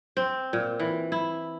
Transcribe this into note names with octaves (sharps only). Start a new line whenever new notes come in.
C4
A#2
E3
E4